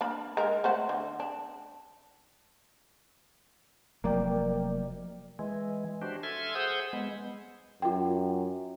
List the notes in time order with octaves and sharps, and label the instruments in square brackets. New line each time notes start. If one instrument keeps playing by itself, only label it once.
[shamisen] A#3 D4 B5
G#3 A#4
A3 C5 F#5
D3
D4
[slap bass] F1 F#3 A#3 [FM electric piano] A#4 D5 G5
[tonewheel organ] E3 G#3
D4 F#4 G4 C5
A4 E5 G#5 C6 F6 G#6
G#4 C5 F#5 D#6 E6 G6
G#3 B3
[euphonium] F#2 [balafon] F4 G5